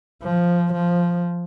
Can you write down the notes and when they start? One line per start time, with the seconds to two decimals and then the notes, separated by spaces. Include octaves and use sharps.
0.23 F3
0.74 F3